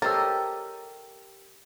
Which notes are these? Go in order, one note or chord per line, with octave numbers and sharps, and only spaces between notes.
G4 A4 A#4 C5 C#5 D#5 E6 A6